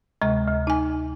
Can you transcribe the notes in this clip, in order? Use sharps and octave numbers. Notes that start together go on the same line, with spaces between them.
D2 C3 G#3 A#5
D2
D#4 G#5